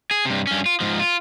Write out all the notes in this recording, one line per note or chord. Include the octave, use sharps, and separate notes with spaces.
G#4
G2 C3
G2 C#4
F4
G#2 F3
F4